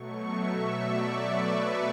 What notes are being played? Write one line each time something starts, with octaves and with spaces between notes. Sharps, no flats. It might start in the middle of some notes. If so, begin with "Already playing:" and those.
Already playing: B2 F#3 A3 C#6
E5
D5
B4